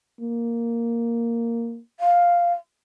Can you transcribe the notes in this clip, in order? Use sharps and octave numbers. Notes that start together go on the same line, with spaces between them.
A#3
F5